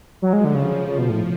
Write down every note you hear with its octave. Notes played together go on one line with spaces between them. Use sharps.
F3 F#3
G#3
D3
C#3
C#3
B2
A2